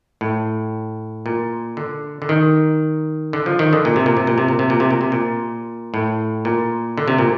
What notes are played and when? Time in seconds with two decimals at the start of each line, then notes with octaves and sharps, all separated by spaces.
0.21 A2
1.26 A#2
1.77 D3
2.22 D3
2.29 D#3
3.33 D3
3.46 F3
3.59 D#3
3.73 D3
3.85 A#2
3.96 C3
4.06 A#2
4.17 C3
4.27 A#2
4.38 C3
4.48 A#2
4.59 C3
4.70 A#2
4.80 C3
4.90 A#2
5.01 C3
5.12 A#2
5.94 A2
6.45 A#2
6.98 D3
7.08 C3
7.18 A#2